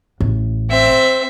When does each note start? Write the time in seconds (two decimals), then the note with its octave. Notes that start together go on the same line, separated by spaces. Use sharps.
0.21 A1
0.70 C4 E5